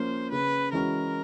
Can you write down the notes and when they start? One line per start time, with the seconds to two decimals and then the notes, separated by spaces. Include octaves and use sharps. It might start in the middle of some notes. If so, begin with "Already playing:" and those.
Already playing: F3 A#3 C#4 C5
0.31 C#3 B4
0.73 E3 G#3 C#4 F#4 A#4